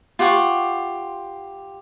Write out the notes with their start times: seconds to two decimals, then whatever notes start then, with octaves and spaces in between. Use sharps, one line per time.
0.19 F4 G4 F#5 C#6